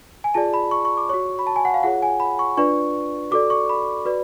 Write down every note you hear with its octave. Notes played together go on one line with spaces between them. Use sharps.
G#5
F4 G#4 D5 A5
B5
C#6
C#6
D6
F#4 C#5 C#6
B5
A5
G#5
F#5
F5
F4 G#4 C#5 F#5
G#5
B5
C#6
D4 F4 B4 D5 C#6
F#4 A4 D5 D6
C#6
B5
F#4 B4 D5